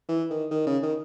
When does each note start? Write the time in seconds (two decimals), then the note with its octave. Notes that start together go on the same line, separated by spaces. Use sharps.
0.09 E3
0.31 D#3
0.51 D#3
0.67 C#3
0.83 D#3